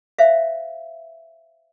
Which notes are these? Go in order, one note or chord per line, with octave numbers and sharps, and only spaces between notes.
C5 E5 F5